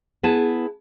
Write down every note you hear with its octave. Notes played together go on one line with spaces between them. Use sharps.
B3 E4 G#4 A5